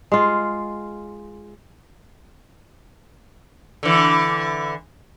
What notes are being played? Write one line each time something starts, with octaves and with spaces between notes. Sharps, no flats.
G#3 F4
D3 E3